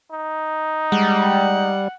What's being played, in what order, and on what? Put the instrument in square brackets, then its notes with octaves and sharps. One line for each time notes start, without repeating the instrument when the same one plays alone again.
[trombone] D#4
[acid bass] G3 [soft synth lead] G#3 [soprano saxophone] F#5